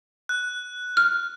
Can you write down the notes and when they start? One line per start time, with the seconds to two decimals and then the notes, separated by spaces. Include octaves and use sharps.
0.29 F#6
0.97 F6